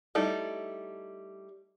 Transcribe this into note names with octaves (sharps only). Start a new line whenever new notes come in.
G3 A3 D#4 E4 A4